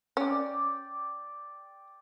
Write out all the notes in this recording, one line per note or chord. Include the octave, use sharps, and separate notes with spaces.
C#4 D5 G5